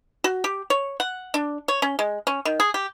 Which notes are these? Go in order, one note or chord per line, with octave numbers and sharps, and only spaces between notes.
F#4
G4
C#5
F#5
D4
C#5
C#4
G#3
C#4
D#3
G#4
G4